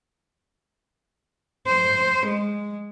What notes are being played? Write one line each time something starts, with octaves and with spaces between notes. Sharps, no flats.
C5
G#3